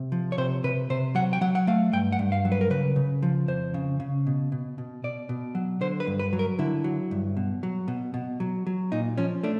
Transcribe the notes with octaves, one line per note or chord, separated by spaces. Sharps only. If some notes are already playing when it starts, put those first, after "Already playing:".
Already playing: C3
F3
C#5
C3 C5
C3 B4
C3 C5
F#3 F#5
G5
F#3 F#5
F#5
A3 F5
G2 G5
F#5
G2
F5
F#3
B4
A#4
C#3 B4
C#3
F3
F2 C5
C#3
C#3
B2
B2
B2
B2 D5
B2
F#3
D3 C5
B4
G2
B4
F#3
A#4
D3 E4
F#3
G2
B2
F#3
B2
B2
F#3
F#3
A#2 D#4
F3 C#4
A3 D4